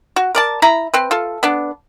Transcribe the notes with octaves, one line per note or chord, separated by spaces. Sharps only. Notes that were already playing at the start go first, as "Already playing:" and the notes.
F#4
A#4 D5 A5
E4 A#5 B5
C4 B4
F4 A4
B3 D4